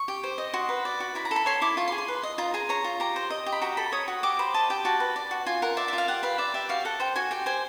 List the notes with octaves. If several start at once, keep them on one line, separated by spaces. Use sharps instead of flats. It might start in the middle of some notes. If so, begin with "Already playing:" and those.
Already playing: C#6
G4
C5
D#5
F#4 C6
B4
D5
F#4
E4 B5
A#5
A4
B5
C#5 C6
E4 D6
F4 C#6
C6
G#4
C6
B4
D#5
F4 A#5
G#4 A#5
C#5 A#5
F4
G4 A#5
C5
D#5
G4
B5
F#4 A#5
A4 B5
C#5 D#6
F#4
G4 D6
C5 B5
D#5 A5
G4 G5
F#4 A5
B4
D5
F#4
F4 G#5
A#4 F#5
D5 E5
E5
F4 F5
G4 F#5
B4 F5
D5 E5
G4 E5
F#4 F5
A4 F#5
C5 G5
F#4 G#5
G4 G5
C5 G#5